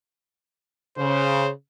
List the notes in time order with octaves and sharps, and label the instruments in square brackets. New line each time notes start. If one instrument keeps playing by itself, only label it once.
[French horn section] C#3 [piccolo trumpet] C5